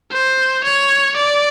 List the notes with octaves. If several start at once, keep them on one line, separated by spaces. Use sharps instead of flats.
C5
C#5
D5